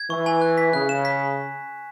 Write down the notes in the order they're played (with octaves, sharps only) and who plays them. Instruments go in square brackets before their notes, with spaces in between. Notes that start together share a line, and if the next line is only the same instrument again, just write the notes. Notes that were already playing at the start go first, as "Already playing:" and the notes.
Already playing: [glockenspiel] G#6
[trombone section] E3 [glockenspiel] C#6
[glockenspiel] G#5
F#6
B6
[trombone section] C#3 [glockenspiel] F#6
[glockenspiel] E7
B6